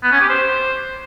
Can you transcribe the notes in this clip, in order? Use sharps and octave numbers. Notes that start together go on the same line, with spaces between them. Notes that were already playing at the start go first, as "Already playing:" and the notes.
B3
C#4
G4
C5